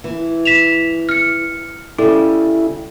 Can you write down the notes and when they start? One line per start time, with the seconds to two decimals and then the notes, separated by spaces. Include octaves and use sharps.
0.04 E3
0.45 B6 E7 F7
1.09 F6 C#7
1.98 C#3 G3 E4 A4